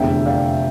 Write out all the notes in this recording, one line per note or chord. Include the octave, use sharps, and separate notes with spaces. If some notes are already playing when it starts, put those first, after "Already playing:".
Already playing: F1 E2 D3 E5 G5
D5 F5